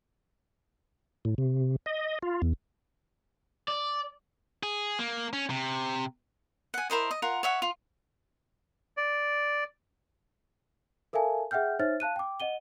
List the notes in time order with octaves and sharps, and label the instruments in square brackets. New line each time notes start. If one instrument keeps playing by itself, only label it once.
[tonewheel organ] A2
C3
D#5
F4
E2
[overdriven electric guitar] D5
[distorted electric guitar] G#4
A#3
C#4
C3
[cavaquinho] F#5 G#5
E4 A#4 C5 D#5
D#5
F4 A#4 F#5
C#5 E5 F#5
F4
[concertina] D5
[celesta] A4 A#4 E5 F5 G#5 A5
G#4 E5 F#5 G5 F6 G6
D#4 C5 C#5 E5 F6 A6
F5 A5 F#6 D#7
G5 D6
D#5 F#5 D#7 G7